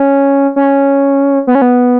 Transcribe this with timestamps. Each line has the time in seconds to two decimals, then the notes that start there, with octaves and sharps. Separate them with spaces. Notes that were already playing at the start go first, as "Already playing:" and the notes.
Already playing: C#4
0.56 C#4
1.47 B3
1.55 C#4
1.62 B3